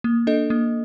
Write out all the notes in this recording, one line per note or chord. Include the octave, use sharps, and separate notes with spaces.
A#3
D4 A4 D#5
A#3